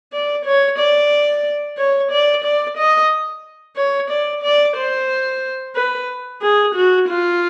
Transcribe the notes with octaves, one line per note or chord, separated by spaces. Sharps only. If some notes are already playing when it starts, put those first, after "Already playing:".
D5
C#5
D5
C#5
D5
D5
D#5
C#5
D5
D5
C5
B4
G#4
F#4
F4